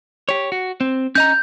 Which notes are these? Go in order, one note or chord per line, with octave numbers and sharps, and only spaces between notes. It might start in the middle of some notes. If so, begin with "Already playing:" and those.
G4 C#5
F#4
C4
C#4 D#5 A#5 G6